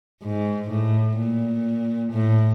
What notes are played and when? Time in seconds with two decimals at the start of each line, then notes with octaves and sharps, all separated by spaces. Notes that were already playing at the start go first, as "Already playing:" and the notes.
0.23 G#2
0.71 A2
1.18 A#2
2.12 A2